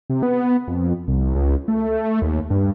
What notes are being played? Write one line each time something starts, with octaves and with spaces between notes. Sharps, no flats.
C3
B3
F2
C2
C#2
A3
D#2
G2